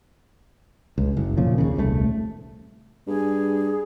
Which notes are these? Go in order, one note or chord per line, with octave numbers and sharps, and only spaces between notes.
C#2
F#1
A#2 C#3 F3
D#2 C#3
D#1 C2 A#2 A3
G2 G#4